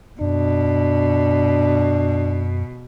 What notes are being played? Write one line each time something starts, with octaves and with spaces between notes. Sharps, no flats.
F#2 B2 D4